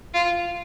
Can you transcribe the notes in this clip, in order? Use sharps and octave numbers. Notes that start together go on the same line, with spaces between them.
F4